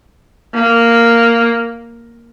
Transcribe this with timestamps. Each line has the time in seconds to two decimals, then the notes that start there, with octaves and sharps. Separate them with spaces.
0.54 A#3